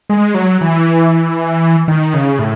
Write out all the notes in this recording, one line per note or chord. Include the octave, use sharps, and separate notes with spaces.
G#3
F#3
E3
D#3
C#3
A2